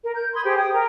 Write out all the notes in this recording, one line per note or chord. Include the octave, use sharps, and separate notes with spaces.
A#4
G6
B5 C6 D#6 G#6
G4 G#4 C5 G5
G5 D#6
A#4 G5 A#5